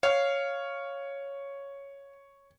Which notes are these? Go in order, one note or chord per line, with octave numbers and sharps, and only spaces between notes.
C#5 F5